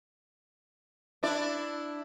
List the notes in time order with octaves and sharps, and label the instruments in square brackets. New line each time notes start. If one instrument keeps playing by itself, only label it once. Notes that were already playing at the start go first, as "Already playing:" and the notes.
[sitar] D4 E4 D5